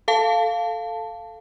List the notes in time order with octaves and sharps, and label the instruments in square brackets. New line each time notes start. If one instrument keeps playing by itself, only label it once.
[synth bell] A4 F5 A5